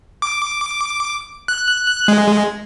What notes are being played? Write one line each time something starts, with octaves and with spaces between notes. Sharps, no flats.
D6
F#6
G#3